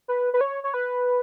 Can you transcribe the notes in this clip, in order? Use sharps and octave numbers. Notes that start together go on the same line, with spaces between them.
B4
B4
C#5
C#5
B4